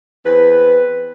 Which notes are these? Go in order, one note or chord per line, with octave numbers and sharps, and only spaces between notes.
E2 C4 B4